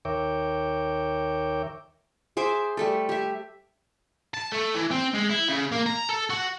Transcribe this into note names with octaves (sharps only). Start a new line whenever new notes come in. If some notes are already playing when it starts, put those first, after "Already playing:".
D#2 A#4 C#5 E5 G5 D6
G#4 C5 E5 D6
G3 A3 A4
G4 E5
A5
A3
E3
C4
G#3
E4
C#3
A#3
A#5
A4
F#4